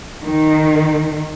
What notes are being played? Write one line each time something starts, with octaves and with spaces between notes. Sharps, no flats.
D#3